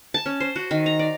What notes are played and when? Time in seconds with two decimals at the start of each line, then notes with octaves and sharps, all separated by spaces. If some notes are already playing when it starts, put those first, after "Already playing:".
0.14 A5
0.26 C#4
0.40 C5
0.56 F#4
0.71 D#3
0.86 A#5
0.99 D5